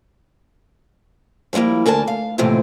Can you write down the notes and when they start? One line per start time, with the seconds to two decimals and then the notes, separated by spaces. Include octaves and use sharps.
1.53 F3 G3 G#3 A#3 E4
1.86 D2 D4 A#4 G#5 A5
2.08 F5
2.38 D#2 A2 C3 E3 F3 C4